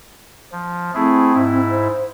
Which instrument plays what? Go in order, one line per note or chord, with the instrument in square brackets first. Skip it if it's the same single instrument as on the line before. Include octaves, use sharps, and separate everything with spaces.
[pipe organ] F3
[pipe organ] A3 E4 G#4 [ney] C4
[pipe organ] G#2 E4
[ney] C5